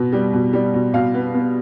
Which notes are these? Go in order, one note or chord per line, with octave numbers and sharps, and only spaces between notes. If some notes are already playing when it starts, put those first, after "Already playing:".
Already playing: B2 B3
G3
B2
G3
B2
B2 F5
B3
B3